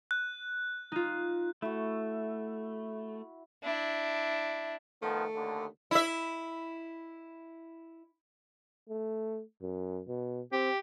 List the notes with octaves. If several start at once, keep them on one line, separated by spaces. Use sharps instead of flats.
F#6
D#4 F4
A3 E4 F#4
D4 E4
D#3 F3 A3 B3
D#2 D3
E4 E5
A3
F#2
B2
C4 G4